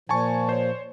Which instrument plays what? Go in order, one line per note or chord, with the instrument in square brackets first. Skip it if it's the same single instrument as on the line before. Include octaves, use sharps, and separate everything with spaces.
[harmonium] A#2 F3 [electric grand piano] G#5 A5 C#6
[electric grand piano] C5 C#5